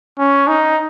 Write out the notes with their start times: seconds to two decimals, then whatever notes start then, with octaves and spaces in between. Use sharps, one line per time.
0.18 C#4
0.48 D#4